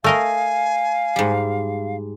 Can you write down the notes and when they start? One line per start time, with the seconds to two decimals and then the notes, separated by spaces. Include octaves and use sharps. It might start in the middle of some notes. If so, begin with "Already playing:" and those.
0.04 A3 A#4 D#5 F5 G#5
1.16 G#2 G3